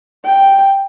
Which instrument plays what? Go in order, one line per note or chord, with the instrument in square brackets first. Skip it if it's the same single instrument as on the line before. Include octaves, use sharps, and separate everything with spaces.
[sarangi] G5